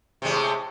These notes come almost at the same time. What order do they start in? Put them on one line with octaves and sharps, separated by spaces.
C3 G#3 A2